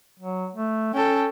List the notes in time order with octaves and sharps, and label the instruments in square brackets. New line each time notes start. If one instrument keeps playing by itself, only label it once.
[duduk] F#3
A3
[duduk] C#4 [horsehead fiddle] A4 G5